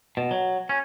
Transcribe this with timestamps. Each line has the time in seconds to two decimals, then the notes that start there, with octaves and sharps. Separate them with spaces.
0.17 B2
0.31 F#3
0.69 C#4